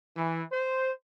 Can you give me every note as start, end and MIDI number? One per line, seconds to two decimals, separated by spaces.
0.17 0.42 52
0.52 0.91 72